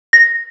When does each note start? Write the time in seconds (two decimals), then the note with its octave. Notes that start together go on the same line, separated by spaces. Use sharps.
0.13 A#6